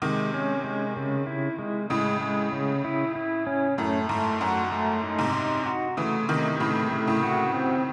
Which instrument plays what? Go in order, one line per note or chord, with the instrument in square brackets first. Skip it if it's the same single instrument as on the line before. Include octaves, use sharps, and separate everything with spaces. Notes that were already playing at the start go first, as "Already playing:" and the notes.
[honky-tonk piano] C3 D#3 [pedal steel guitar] G#3
[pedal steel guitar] C#4
G#3
C#3
E4
G#3
[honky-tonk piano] A2 C#3 [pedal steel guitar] G#3
[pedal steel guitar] G#3
C#3
E4
E4
C#4
[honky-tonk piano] F#2 A2 [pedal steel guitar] A3
[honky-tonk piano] G#2 [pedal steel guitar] A3
[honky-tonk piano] F#2 [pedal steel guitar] F#4
[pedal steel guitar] A3
D#4
[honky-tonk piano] G#2 C3
[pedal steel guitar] D#4
F#4
[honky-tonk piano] C#3 E3 [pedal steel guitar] A3
[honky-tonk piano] C3 D#3 [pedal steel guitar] D#4
[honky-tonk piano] A2 C#3 [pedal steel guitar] A3
[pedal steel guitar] A3
[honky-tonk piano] A2 C#3
[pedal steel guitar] F#4
C4